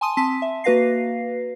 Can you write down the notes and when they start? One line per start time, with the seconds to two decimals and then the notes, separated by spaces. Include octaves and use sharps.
0.01 G#5 A5 C6 D#6 D#7
0.17 C4 A5 C6 B6
0.42 E5
0.64 A#3 F#4 B4 F5 A#6 C7